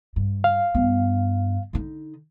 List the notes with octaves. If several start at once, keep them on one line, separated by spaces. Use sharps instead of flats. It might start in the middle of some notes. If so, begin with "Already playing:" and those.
G2
F5
G2 B3
D3 D#4